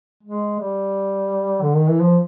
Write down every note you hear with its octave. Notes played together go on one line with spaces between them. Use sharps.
G#3
G3
D3
D#3
E3
F3